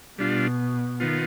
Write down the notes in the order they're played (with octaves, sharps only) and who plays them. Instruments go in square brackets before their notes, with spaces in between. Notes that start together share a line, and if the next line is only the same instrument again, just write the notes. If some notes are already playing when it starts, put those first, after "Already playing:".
[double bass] B2 [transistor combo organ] G3 D4 F4
[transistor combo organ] D#3 B3 F4